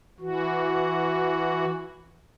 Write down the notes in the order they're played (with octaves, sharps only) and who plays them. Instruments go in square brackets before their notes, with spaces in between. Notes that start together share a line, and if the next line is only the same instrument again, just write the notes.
[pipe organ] E3 F#4